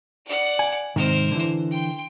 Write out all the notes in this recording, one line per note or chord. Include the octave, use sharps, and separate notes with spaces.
D5 F#5
G#5
G#2 C3 D#3 A#4 C5
D3 E3
G5 C6